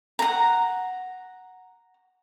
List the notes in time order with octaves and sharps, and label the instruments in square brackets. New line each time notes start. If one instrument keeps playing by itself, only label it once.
[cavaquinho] F#5 A#5